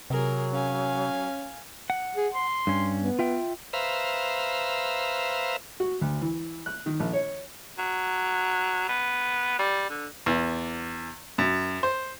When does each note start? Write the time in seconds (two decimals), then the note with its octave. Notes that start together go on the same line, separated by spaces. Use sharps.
0.10 C3 F#3 G#4 A#4
0.53 C#4 F5 G#5
1.90 F#5
2.16 G#4
2.35 C6
2.67 G2 C#4
2.98 B3
3.19 F4 E5 G5
3.73 B4 C5 E5 F5 A#5
5.80 F#4
6.01 D2
6.21 E3
6.66 F#6
6.86 D#3
7.00 A#1
7.13 C#5
7.78 F#3
8.88 B3
9.59 G3
9.90 D3
10.26 E2
11.38 F#2
11.83 C5